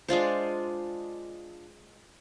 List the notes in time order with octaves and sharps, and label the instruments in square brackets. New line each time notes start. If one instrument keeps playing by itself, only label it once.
[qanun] G#3 D4 F4 C5